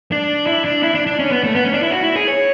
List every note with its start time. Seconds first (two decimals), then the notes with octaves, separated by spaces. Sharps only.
0.12 D4
0.47 E4
0.65 D4
0.83 E4
0.95 D4
1.07 D4
1.19 C#4
1.31 B3
1.44 A3
1.55 B3
1.65 C#4
1.74 D4
1.83 E4
1.91 F#4
2.03 E4
2.16 G#4
2.28 C#5